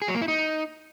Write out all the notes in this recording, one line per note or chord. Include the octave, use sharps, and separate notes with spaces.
G#4
F#3
A#3
E4
D#4